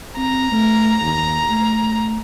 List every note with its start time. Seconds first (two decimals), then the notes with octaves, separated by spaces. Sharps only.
0.17 C4 A#5
0.52 A3
1.02 D#2
1.50 A3